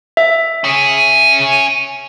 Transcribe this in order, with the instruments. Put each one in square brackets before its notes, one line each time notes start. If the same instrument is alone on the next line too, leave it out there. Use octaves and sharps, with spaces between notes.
[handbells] E5
[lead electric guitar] C#4 G#4